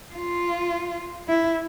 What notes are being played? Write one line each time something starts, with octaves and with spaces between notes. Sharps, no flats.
F4
E4